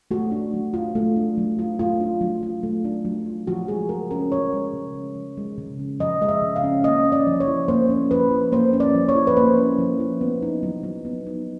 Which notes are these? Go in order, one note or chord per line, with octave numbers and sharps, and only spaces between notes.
A3 F#4
D4
F#3
F4
A3
D4
F#3
F4
A3 F4
D4
F#3
F4
A3
D4
F#3
F4
F3 F#4
G#3 G#4
C#3 A#4
C#4 A#4
F3 C#5
G#3
C#3
C#4
F3
G#3
C#3
C#4
F3 D#5
G#3 D#5
E5
C#3
F5
C#4
A#3 D#5
C#4
D5
F3
C#5
E4
A#3 C5
C#4
F3 B4
E4
A#3 C5
C#4
D5
F3
C#5
E4
B4
A#3 C5
C#4
F3
E4
B3
D#4
F#3
F#3
B3
D#4